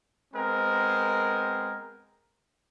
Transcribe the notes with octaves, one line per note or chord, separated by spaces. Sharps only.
G#3 B3 C4 A#4